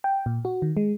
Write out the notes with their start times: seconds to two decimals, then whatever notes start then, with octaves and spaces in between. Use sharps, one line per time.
0.04 G5
0.26 A#2
0.45 F#4
0.62 D#3
0.77 G#3